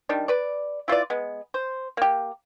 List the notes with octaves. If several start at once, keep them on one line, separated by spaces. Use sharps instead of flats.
D#3 G3 D4
B4 D5
E4 F4 B4 D5
G#3 B3
C5
A#3 G4